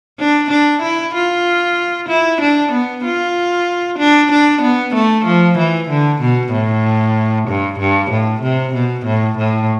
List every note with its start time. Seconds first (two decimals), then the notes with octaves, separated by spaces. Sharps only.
0.19 D4
0.50 D4
0.82 E4
1.14 F4
2.09 E4
2.41 D4
2.72 B3
3.04 F4
3.99 D4
4.31 D4
4.62 B3
4.95 A3
5.25 F3
5.58 E3
5.90 D3
6.21 B2
6.52 A2
7.48 G2
7.80 G2
8.11 A2
8.42 C3
8.74 B2
9.06 A2
9.38 A2